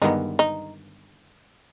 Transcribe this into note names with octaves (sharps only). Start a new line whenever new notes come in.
G1 G2 D#3 G#3 B3 D#4
D#4